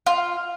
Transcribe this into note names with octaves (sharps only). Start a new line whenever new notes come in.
F4